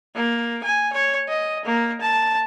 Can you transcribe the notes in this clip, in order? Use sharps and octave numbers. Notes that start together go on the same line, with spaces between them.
A#3
G#5
C#5
D#5
A#3
A5